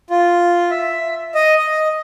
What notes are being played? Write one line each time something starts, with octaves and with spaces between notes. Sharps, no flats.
F4
E5
D#5
D#5